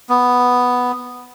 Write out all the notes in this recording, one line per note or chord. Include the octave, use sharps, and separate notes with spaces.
B3